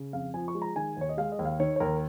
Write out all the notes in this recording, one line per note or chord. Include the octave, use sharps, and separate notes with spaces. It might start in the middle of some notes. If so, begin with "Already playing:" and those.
Already playing: C#3
F2 F5
F3 G#5
C#6
G#3
A#5
D#3 G#5
D#2 C#5
D#5
G#3 F5
D#5
D#2
F5
D#3 C#5
C#5
D#2 A#4